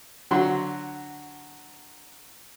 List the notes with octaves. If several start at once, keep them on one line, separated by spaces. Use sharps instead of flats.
D3 F#3 F#4 C6